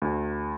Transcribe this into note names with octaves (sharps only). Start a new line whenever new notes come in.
D2